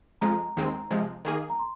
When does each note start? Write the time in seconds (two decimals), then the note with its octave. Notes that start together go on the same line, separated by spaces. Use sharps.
0.21 F2 F3 G#3 A#5
0.57 D#2 D#3 G#3 C4
0.91 C3 F3 G#3
1.25 D#3 A#3 G#4
1.50 A#5
1.59 C6